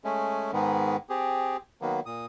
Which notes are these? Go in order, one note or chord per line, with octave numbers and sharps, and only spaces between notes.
G#3 A3 C#4
G#2 D#3 G#3 B3
C4 G4 G#4
D#3 F#3 A#3 B3
A#2 D#6